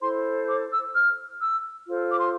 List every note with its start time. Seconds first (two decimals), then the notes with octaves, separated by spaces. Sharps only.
0.01 E4 A4 C5 C6
0.49 D6
0.72 E6
0.94 F6
1.42 E6
1.88 F4 A4 C5
2.12 D6
2.19 C6